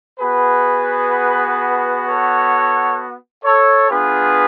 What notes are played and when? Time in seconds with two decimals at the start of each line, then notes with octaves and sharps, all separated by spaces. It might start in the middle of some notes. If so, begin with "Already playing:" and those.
0.20 B3 F#4 G#4 B4
2.06 A4 C#5
3.44 A4 C#5
3.90 B3 D4 F4 G#4 B4